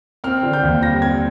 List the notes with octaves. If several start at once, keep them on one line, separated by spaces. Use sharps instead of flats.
C4 F6
D3
G6
D#2
G3 A#6
C4 G#6